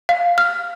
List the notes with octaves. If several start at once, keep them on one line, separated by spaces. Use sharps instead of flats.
F5
F6